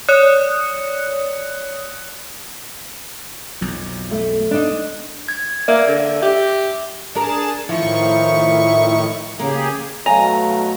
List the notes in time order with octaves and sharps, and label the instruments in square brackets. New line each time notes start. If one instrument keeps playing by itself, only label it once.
[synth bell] C#5 D5 D#6 F#6 C#7
[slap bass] B1 F2
[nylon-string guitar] A3
D4 D#4
[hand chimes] G#6
[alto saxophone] A#3 [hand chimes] D5 E5
[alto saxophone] D3
[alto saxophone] G4 [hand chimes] E5
[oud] D4 A#4 [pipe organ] G#4 A5
[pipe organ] A2 D#3 C#6 [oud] F3 [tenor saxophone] E4
[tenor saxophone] C#3 [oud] A#3 [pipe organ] G4 G#4
[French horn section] B2 F#3 A3 [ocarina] F5 [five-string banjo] G#5 [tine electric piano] A#5